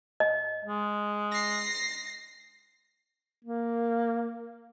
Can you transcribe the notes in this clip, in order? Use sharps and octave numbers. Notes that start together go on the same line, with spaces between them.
D#5
G#3
A#6 C7
A#3